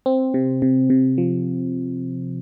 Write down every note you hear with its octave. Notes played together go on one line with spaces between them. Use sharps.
C4
C3
C3
C3
F3